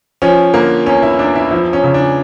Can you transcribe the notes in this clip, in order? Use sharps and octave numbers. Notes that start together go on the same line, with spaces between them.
F3 C#4
D3 A#3
E2 C#4
E4
E2 D4
E4
F3 E4
C#4
C#3
D4